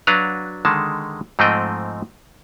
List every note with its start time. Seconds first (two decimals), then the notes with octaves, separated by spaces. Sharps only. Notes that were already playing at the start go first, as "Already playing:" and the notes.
0.07 F#3 D4 F#4 B4 F5 A#5
0.65 D3 D#3 G#3 A5
1.39 G#2 F3 A3 C4 D#5 G5